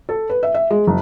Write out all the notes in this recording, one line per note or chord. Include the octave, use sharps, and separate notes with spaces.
A4
B4
E5
E5
G#3
F#1